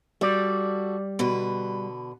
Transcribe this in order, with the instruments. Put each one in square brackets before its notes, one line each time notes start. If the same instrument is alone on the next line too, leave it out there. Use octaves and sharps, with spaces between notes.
[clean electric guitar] G3 D5 [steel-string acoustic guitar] F#4 A4
[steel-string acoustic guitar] B2 D3 B4